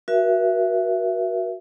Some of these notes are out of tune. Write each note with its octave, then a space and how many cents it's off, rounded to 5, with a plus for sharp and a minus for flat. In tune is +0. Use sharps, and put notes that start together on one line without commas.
F#4 +0 A#4 +40 E5 +20